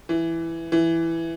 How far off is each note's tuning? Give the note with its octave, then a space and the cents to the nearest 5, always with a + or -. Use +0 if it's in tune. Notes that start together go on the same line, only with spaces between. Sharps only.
E3 +5
E3 +5